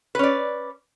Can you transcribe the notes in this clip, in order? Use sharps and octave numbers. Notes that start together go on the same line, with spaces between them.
C#4 B4 D5